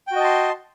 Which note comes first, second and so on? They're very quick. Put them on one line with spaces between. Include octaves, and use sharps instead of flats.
G5 F#4 D#5 A5 C6